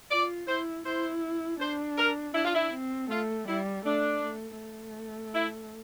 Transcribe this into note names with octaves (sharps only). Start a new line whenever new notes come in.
F4 D5
E4 C5
E4 C5
D4 C5
A#4
D4 E4
F4
E4
C4
A3 F4
G3 E4
A3 D4
A3
A3
E4